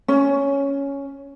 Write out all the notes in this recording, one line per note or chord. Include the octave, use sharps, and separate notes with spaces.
C#4